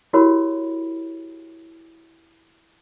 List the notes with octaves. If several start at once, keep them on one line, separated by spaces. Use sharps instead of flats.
E4 F#4 G4 A#4 C#5 B5